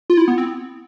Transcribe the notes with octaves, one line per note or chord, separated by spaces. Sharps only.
F4
E4
B3
C4